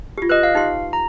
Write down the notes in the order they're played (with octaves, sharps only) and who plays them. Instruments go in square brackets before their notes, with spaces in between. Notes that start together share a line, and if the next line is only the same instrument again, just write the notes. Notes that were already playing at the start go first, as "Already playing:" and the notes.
[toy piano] F4 G4
[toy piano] G4 B4 [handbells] D#5 F#6
[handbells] F5
[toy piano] D#4 G4 C6
[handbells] A#5